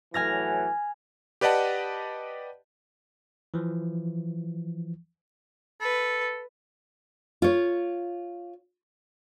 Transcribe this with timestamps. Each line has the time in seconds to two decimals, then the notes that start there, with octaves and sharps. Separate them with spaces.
0.14 A2 E3 F#3 G#5 F6 A#6
1.41 G4 B4 D5 D#5 F#5 A5
3.54 E3 F3
5.81 A4 B4
7.42 F4 C#5